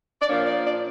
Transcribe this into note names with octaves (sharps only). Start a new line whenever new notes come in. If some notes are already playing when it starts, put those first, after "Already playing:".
D5
A#2 F3 A#3 D4 C#5
D5
D5